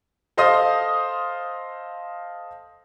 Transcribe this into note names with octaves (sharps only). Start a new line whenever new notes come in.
A4 C5 D#5 F5 C6 D#6